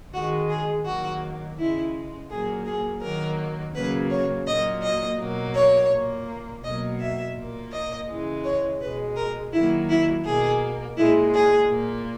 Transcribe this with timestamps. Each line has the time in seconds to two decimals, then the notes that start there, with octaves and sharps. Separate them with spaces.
0.14 D#3 G#3 F#4
0.49 G#4
0.85 D#3 F#3 A#3 F#4
1.58 C#3 G#3 E4
2.29 A#2 F#3 A#3 G#4
2.66 G#4
3.02 D#3 F#3 A#3 A#4
3.75 C#3 F#3 A#3 B4
4.10 C#5
4.47 A#2 F#3 A#3 D#5
4.83 D#5
5.19 B2 F#3 A#3
5.55 C#5
5.91 A#2 A#3
6.64 B2 F#3 A#3 D#5
7.00 E5
7.36 A#2 A#3
7.72 D#5
8.08 C#3 E3 G#3
8.44 C#5
8.80 B2 G#3 B4
9.16 A#4
9.53 D#3 F#3 A#3 E4
9.89 E4
10.25 B2 A#3 G#4
10.97 A#2 G#3 E4
11.34 G#4
11.69 A#2 A#3